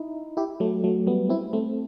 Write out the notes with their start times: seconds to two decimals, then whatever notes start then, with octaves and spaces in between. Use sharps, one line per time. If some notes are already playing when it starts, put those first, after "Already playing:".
Already playing: D#4 E4
0.37 E4 G4
0.60 F#3 A3
0.84 F#3 A3
1.07 G3 B3
1.29 C4 E4
1.53 A3 C4